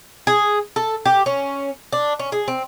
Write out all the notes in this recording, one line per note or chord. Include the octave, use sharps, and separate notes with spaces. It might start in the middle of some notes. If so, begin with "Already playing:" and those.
G#4
A4
G4
C#4
D4
C#4
G#4
C4